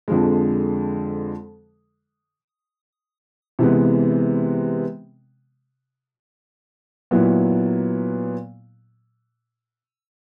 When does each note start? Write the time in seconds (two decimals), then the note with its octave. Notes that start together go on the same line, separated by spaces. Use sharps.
0.08 F2 D3 F3 G#3
3.59 C3 E3 G#3 B3
7.11 A#2 F#3 B3 E4